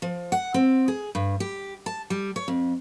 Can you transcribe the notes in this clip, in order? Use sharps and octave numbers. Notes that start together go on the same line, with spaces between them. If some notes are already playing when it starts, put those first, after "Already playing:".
F3
F#5
C4
G#4
G2
G4
A5
G3
C#5
F2